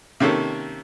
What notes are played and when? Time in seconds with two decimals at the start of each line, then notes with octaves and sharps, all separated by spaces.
0.20 C3 D#3 A#3 C#4 A4